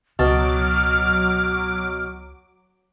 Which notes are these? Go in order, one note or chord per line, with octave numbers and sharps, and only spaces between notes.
C#2 B2 F#3 A5 D6 F6